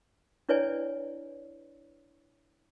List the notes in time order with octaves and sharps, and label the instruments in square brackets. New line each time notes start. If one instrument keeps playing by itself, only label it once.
[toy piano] D4 E4 B4 C#5 D5 G#5